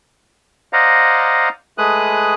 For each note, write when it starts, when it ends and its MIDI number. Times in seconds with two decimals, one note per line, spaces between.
0.73 1.49 72
0.73 1.49 74
0.73 1.49 75
0.73 1.49 77
0.73 1.49 78
0.73 1.49 82
1.78 2.34 56
1.78 2.34 57
1.78 2.34 68
1.78 2.34 71
1.78 2.34 87
1.78 2.34 90